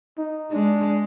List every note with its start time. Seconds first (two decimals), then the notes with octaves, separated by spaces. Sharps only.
0.18 D#4
0.52 G#3 D4